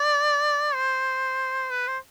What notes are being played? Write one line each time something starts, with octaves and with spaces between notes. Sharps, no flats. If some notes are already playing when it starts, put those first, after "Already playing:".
Already playing: D5
C5
B4
C5